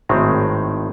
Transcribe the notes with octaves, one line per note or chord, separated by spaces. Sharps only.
G#1 A2 D#3 G#3 C4